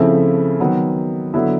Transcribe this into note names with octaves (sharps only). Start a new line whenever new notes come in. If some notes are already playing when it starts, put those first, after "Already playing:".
Already playing: C#3 F3 A3 C4 E4
D#3 F#3 B3
D3 F#3 B3 E4